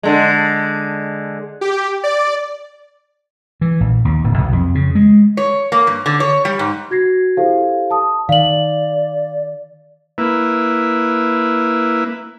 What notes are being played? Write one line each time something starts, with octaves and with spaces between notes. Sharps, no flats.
D3 G#3
G4
D5
E3
A#1
D#2
D1
B1
F2
C#3
G#3
C#5
A#3
G2
D3
C#5
G3
G#2
F#4 G#6 A#6 C7
E4 G4 A4 C5 F5
A5 D#6
D#3 D5 F5 F#7
A#3 E4 B4